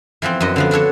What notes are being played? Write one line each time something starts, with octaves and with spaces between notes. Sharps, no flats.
E3 F3 B3 C4
F#2 F#4 D#5
D3 F3 B3
D4 F#4 A4 C#5